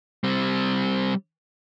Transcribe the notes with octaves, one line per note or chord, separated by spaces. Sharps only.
G3 C4